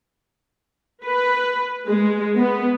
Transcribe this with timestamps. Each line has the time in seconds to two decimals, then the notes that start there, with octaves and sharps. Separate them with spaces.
1.04 B4
1.87 G#3
2.38 B3